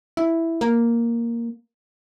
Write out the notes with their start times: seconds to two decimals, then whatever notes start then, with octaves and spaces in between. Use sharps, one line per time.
0.17 E4
0.61 A#3